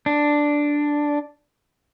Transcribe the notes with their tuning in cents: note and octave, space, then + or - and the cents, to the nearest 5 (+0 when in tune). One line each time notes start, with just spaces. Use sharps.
D4 +0